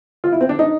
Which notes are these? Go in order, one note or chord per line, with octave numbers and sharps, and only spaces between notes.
F4
E4
C4
D4
D#4